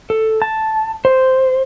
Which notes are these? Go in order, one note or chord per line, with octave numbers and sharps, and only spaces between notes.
A4
A5
C5